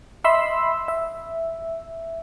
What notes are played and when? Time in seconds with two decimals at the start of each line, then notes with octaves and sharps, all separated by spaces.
0.24 D#5 E5 B5 C6 E6
0.88 E5